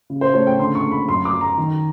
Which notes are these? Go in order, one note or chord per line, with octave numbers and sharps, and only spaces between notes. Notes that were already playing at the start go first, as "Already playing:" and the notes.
C#3
C5
A3 C#5
G5
D3 C6
C#6
A#3
B5
F#2 C6
D6
F#3
A#5
D#3